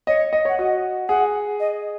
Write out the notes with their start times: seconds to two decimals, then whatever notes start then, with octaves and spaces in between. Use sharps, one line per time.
0.07 C#5 D#5
0.33 D#5
0.45 C#5 F#5
0.58 F#4 D#5
1.09 G#4 F#5
1.60 D#5